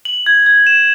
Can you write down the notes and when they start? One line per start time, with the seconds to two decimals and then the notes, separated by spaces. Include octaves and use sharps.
0.05 F#7
0.26 G#6
0.46 G#6
0.67 E7